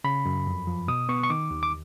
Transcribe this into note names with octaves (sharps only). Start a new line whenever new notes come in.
C#3 B5
F#2
F2
F3
B2 D#6
B3 C#6
C#6
D#3 D6
D#2
D6